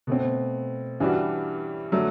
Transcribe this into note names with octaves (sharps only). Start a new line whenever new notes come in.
B2 A3 C4
G2 E3 G3 D4 F#4
D3 F#3 A3 D4